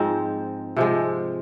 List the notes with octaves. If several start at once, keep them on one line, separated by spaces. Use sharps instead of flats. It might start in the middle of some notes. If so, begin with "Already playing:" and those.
Already playing: G#2 F3 G#3 C4
C3 F3 G#3